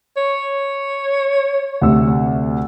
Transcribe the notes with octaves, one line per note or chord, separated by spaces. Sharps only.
C#5
D2 C3 E6